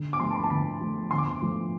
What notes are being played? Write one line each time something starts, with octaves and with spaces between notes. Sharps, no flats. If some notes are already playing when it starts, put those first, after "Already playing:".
Already playing: D3
D6
F3 A3 C6
A5
B5
A5
D3 B5
F3 A3
D3 C6
D6
C6
F3 A3